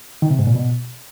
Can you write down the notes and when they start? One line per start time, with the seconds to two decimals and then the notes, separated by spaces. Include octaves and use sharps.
0.22 D#3
0.31 C3
0.39 G#2
0.47 A#2
0.55 B2